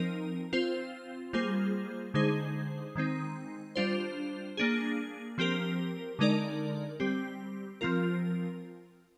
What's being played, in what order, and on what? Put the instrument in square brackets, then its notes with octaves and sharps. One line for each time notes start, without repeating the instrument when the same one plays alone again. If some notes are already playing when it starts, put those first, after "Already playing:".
Already playing: [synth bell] F3 C4 D#4 A#4
C4 F4 C5
G3 A#3 F4 G#4 C5
D3 G#3 D#4 G#4 C5
D#3 G#3 C4 D#4
G3 D4 F4 C5
A#3 D4 G#4
F3 C4 G4 A#4
D3 G#3 D#4 A#4 D5
G3 C4 G4
F3 C4 F4 A#4